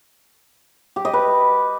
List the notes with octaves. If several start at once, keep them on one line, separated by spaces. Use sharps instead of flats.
G4
D#5
B4